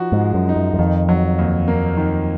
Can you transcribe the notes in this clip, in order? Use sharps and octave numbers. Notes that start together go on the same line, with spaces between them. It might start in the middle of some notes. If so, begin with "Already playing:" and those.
Already playing: F3 D#4 F#4
G#2
G#3
F#2
D#4
F#2
F#2
F2 D#3
F#3
D#2
A#3
D#3